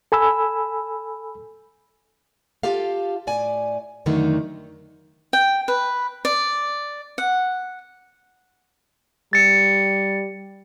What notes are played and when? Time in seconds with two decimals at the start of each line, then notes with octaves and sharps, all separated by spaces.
0.12 A4 G#5 B5 E6
2.63 F4 G4 A4 F5
3.27 A2 D5 G#5
4.06 F2 D3 D#3 F#3 A3 D#4
5.33 G5
5.68 B4
6.25 D5
7.18 F#5
9.33 G3 A6 C#7